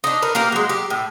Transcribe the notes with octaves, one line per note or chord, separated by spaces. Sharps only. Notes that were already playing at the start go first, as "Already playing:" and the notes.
D4 D#4
A#4 B4
A#3 G4 A#4
F#3 G#3
G4
A2